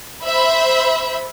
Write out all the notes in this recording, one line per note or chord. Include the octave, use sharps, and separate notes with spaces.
C5 E5 B5